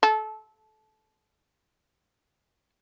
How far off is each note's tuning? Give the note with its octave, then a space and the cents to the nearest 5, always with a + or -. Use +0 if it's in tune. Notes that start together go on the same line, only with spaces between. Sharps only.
A4 -25